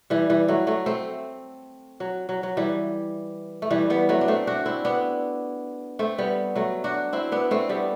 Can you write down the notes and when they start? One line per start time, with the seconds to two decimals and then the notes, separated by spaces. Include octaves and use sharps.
0.10 E3 G3
0.30 E3 G3
0.48 F#3 A3
0.67 F#3 A3
0.86 A3 C4
2.00 F#3
2.29 F#3
2.43 F#3
2.57 E3 G3
3.62 A3
3.71 E3 G3
3.90 G3 B3
4.09 F#3 A3
4.21 D4
4.28 A3 C4
4.47 D4 F#4
4.66 C4 E4
4.85 B3 D4
5.99 A3 C4
6.18 G3 B3
6.56 F#3 A3
6.84 D4 F#4
7.13 C4 E4
7.32 B3 D4
7.51 A3 C4
7.69 G3 B3